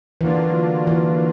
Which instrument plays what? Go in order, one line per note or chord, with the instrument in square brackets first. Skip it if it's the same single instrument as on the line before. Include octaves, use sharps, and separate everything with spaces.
[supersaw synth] D3 F#3 A#3 D4 F4 [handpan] E3
[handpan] E3